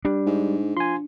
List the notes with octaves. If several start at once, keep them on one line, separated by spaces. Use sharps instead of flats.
G3 D4
G#2
F3 G#5 C6